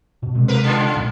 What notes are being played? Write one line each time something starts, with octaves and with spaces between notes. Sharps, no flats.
B2
C3 G#3 C4
A#3 A#4 B4
C#3 F4
A#1